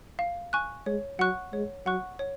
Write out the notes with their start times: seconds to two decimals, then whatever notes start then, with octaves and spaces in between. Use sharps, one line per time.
0.19 F5
0.53 G#5 C#6 F#6
0.86 G#3 C#5
1.19 F#3 F#5 C#6 F#6
1.53 G#3 C#5
1.86 F#3 F#5 C#6 F#6
2.19 C#5